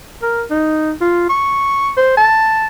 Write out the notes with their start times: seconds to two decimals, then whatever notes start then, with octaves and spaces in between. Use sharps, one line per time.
0.22 A#4
0.50 D#4
1.01 F4
1.29 C#6
1.97 C5
2.17 A5